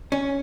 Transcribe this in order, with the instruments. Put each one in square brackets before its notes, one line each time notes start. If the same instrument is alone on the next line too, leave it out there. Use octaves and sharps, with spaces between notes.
[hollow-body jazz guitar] C#4